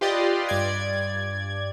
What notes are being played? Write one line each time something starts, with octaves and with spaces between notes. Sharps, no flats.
F4 G4 B4 D5 D#5 C6
G2 D5 G#6